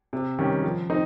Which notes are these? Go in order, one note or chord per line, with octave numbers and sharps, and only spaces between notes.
C3
D#3 G3 C#4
F3
C4 D#4